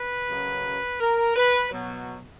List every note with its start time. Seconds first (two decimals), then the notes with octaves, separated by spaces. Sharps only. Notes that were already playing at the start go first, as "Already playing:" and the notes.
Already playing: B4
0.28 F#2 C#3 F#3
1.00 A#4
1.36 B4
1.71 B2 F#3